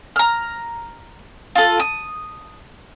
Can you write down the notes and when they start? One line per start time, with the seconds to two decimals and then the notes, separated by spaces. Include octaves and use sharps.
0.16 A#5 F6
1.55 F4 A4
1.80 D#6